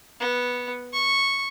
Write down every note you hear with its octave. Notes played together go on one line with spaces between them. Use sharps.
B3
C#6